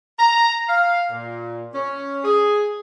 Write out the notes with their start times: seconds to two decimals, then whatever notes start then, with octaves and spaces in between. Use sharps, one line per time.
0.19 A#5
0.68 F5
1.11 A#2
1.74 C#4
2.24 G#4